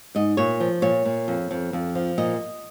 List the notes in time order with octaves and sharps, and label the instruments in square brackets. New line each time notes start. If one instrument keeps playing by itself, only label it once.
[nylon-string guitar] G#2 D#5
A#2 C#5
F3
A#2 C#5
A#2
F2
F2
F2
F3
A#2 D#5